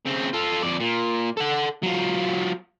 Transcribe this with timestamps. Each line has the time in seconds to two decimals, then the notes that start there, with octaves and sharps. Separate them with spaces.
0.06 C#3 C4
0.33 F4 A4
0.63 F2 D5
0.80 A#2
1.37 A4 F#5
1.83 F#3 F4